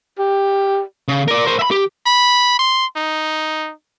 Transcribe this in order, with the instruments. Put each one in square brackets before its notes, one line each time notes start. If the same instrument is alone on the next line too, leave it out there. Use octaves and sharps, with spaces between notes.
[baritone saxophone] G4
[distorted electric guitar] C#3
A#4 D5
A#4 C5
E5 B5
G4
[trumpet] B5
C6
D#4